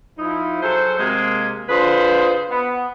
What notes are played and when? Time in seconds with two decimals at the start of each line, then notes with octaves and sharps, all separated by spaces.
0.18 F3 D#4 E4
0.62 F#3 G#4 A4 C5
0.98 C3 G#3 A#3
1.69 D3 F4 G#4 B4 C5
2.50 B3